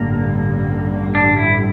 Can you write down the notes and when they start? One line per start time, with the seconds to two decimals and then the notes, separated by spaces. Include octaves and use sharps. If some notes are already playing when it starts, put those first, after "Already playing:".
Already playing: A1 G2 D3 G3 A#3
1.15 D4
1.37 E4